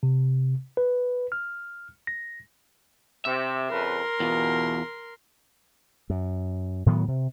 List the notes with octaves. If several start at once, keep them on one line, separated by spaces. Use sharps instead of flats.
C3
B4
F6
A#6
C3 E5
F2 C#3 A#4 B4 C6
E2 B2 F4
F#2
A2 D#3 F#3 B3
C3